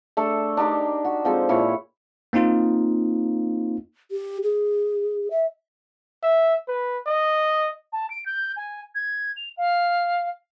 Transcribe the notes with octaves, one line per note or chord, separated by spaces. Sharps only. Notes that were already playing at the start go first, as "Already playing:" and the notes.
A3 D4 A4
D4 D#4 G4 A#4
F#4
F3 G#3 C4 A4
A#2 E4 C#5
A#3 C4 D#4 F4
G4
G#4
E5
E5
B4
D#5
A5
D7
G6
G#5
G#6
F7
F5